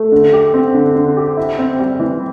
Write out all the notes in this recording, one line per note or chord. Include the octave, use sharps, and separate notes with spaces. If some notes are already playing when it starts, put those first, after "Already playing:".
Already playing: A3
D3
G4
C4
D3
D3
G4
E4
C4
G3
E3